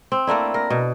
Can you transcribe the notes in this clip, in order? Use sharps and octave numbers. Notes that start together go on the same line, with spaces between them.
C4
A3 A#3 D4 E4
A#4
B2